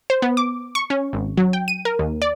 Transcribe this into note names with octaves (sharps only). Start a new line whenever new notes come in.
C5
B3
D6
C#6
C#4
G#1
F#3
G5
D#7
A#4
D#2
D5